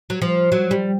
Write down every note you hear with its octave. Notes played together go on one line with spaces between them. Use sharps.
F#3
F3
F#3
G3